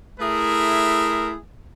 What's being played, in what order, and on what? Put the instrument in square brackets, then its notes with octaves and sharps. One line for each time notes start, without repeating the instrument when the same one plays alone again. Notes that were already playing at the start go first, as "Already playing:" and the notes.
[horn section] A3 E4 G#4 A#4 E5